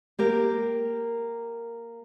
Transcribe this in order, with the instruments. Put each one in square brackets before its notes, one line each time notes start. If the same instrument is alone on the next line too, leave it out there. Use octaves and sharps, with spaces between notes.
[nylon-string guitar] A#3 G4 A#4